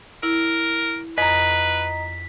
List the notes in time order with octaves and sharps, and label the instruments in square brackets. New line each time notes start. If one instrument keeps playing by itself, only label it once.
[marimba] E4 [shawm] A#4
[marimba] F2 [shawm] B4 [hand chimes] D#5 A#5 [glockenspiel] B6